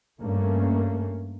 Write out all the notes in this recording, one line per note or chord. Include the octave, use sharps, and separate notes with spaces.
G2 A3 A#3 C#4